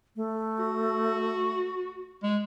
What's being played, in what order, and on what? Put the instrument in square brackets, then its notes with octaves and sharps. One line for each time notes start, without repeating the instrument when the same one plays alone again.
[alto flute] A3
[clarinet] F#4
G#3